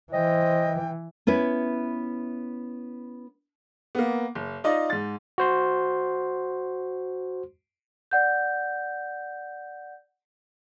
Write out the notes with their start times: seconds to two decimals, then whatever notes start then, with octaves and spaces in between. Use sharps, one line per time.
0.13 E3 C5 D#5 G5
1.27 B3 C#4 E4 B4
3.95 A#3 B3
4.35 F#1
4.64 D#4 F4 D5 D#5
4.90 G#2 A6
5.38 F#4 C5 C6
8.11 D5 F#5 G6